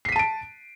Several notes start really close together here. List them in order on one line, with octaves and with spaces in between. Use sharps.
C7 B6 D#7 A5 D7